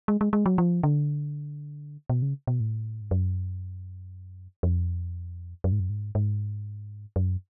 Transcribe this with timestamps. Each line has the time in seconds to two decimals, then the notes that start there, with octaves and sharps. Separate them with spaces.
0.08 G#3
0.21 G#3
0.33 G#3
0.46 F#3
0.58 F3
0.83 D3
2.10 B2
2.22 C#3
2.47 B2
2.60 A2
3.01 G#2
3.11 F#2
4.63 F2
5.64 F#2
5.72 G#2
5.80 F#2
5.90 G#2
6.15 G#2
7.16 F#2